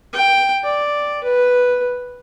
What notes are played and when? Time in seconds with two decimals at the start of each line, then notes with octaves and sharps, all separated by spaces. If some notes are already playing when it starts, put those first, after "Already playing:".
0.13 G5
0.63 D5
1.24 B4